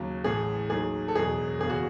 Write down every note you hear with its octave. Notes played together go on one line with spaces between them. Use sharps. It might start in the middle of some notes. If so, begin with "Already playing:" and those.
Already playing: D#2 C#3 F#3
A1 A2 E3 G#4
D#2 D#3 F#3 G#4
A4
E1 E2 B2 F#3 G#4
F#1 E2 C#3 G#4
F#4